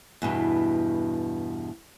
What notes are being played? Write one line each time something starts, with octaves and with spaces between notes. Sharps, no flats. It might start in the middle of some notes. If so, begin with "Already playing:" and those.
E2 G2 B2